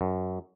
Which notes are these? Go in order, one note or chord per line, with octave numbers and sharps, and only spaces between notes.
F#2